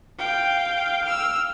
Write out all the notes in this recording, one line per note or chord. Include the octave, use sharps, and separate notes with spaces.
F5 G5
E6 F6